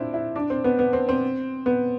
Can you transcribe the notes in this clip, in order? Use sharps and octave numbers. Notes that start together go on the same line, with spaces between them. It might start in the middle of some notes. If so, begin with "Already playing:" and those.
Already playing: C4 D4 E4 F4
E4
D4
C4
B3
B3
C4
C4
B3